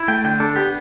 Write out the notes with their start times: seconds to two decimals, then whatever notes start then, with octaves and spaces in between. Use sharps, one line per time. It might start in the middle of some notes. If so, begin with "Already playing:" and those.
Already playing: E4
0.08 A3 G5
0.24 D3 G5
0.40 D4 A4
0.56 B3 G4